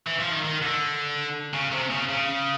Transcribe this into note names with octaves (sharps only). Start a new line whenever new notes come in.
E3
F3
D#3
D#3
D3
C#3
C3
C#3
C#3